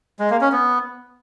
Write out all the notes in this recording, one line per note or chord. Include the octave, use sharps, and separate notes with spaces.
G#3
A#3
C#4
B3